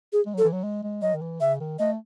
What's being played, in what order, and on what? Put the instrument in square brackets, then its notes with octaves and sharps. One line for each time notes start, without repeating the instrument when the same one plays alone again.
[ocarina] G#4
[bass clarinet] G#3
[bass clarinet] F#3 [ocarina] A4
[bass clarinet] E3
F#3
G#3
G#3
[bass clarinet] F#3 [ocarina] D#5
[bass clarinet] D#3
E3
[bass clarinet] C#3 [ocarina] E5
[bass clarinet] D#3
[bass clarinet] A3 [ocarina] D#5